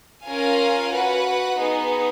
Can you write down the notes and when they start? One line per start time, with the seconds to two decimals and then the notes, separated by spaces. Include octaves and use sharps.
0.25 C#4 F4 A#4 F5 G#5
0.92 F#4 B4 F#5
1.57 B3 D#4 G#4 B4